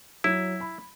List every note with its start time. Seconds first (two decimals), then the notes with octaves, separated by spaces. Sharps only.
0.24 F#3 E4
0.60 B5